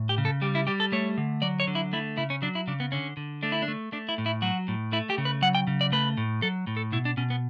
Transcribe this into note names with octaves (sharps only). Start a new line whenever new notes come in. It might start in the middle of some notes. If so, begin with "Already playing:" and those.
Already playing: A2
G4
C#3
A4
G3 G4
E4
G3 G4
A4
A3 C#5
D3
F#3 D5
C#5
D3
E4
A3 E4
C#3 E4
C#4
F#3 D4
E4
C#3 D4
B3
D3 C#4
D3
A3 D4
E4
D4
A3
A3 D4
E4
A2
E4
F#3 F#4
A2
A3 E4
G4
C#3
B4
F#3 F#5
G5
C#3
D5
A3 B4
A2
F#3 A4
A2
A4
B2 E4
D4
B2 C#4
B3